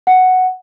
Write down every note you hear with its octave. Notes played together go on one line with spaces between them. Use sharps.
F#5